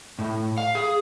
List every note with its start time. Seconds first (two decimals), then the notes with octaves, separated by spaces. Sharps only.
0.19 A2
0.58 F5
0.75 G#4